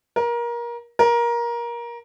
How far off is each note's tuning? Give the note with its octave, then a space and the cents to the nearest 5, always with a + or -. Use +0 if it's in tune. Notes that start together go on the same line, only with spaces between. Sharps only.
A#4 +25
A#4 +20